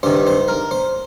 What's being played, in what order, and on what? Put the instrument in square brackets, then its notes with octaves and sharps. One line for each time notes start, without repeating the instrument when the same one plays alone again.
[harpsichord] G2 D#3 C5
C5
A#4
C5